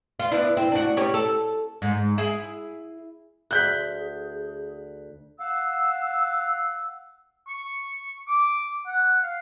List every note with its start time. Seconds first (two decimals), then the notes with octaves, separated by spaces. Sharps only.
0.20 F4
0.32 B3 D4 E4
0.57 C4
0.72 D4 F#4
0.97 C#4 G4 C#5
1.14 A4
1.82 G#2
2.18 E4 G#4
3.51 D2 G#4 F#6 G6 B6
5.40 F5 F#5 E6
7.48 C#6
8.28 D6
8.87 F#5
9.23 F5